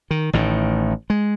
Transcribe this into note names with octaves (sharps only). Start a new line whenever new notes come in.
D#3
A1 A2 D#3
G#3